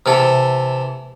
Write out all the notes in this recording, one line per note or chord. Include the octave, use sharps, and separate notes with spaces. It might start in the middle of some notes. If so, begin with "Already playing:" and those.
C3 E3 A4